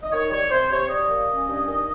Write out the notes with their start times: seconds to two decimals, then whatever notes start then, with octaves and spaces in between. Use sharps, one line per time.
0.03 D#5
0.12 D#3 C#5
0.31 G3 C#5
0.50 C3 C5
0.70 C3 C#5
0.89 G3 D#5
1.10 A#3
1.29 C#4
1.47 G2
1.67 D#3